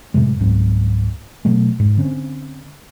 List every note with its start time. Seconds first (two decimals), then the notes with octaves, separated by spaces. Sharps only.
0.14 F#2 A2 C3 G#3
0.40 C#2 G#2 F#3 C4
1.45 B2 F#3 A3
1.79 G#2
1.97 D3 C4 C#4